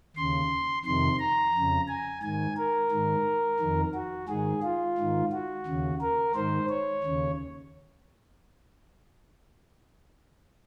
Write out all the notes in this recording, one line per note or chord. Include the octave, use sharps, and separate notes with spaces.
D#2 C#3 C6
F2 C3 D#3 C6
A#5
F2 C#3
G#5
G#2 D#3 G#5
A#4
G#2 D#3
F2 D#3
F#4
G#2 D#3 G#4
F4
G#2 D#3
F#4
D#2 C#3
A#4
G#2 D#3 C5
C#5
D#2 C#3